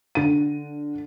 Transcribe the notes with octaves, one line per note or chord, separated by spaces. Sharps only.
D3 D#7